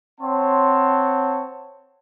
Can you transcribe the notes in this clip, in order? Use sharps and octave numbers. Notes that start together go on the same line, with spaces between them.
C4 C#5 F#5 A5 C6